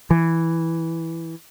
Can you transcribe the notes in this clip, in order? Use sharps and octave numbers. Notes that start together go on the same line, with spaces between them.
E3